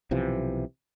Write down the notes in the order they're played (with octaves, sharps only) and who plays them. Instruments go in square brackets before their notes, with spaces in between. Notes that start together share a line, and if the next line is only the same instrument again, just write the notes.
[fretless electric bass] B1 C3 E3 F3